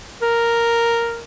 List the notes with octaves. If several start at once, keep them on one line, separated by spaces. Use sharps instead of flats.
A#4